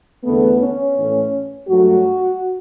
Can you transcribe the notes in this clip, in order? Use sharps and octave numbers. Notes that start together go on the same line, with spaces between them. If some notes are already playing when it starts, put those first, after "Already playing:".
E2 D3 A3 B3
C#4
A2 E3 A3
G2 F#3 A3 F#4